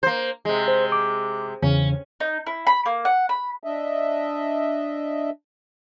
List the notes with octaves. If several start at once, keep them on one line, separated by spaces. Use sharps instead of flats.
A#3 C5
C3 G#3
C5
D6
E2 C#3 C#4
D#4
E4
B5
A#3
F#5
B5
D4 D#5 E5